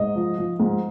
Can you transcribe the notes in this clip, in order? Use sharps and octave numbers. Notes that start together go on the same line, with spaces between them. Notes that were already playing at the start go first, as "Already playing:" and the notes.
Already playing: G#2 D#5
F3
F3
G#2